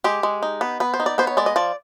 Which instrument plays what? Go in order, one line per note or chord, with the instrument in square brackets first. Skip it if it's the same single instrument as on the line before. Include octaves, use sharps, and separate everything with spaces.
[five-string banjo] G#3 G4
G#3
D#4
B3
B3 B4
C5
D#4
D5
B3 C5
C#5
G#3 D5
D#5
F3 D5